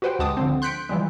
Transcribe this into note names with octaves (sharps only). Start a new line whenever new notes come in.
F#4 G4 B4 C5 F#5 G5
D2 G#3 A5 D6 D#6
D3 F3 C4
C6 F#6 G6 B6 C#7 D7
E3 F3 G3 G#3